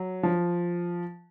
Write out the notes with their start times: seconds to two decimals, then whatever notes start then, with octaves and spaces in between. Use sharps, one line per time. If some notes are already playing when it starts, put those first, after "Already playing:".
Already playing: F#3
0.23 F3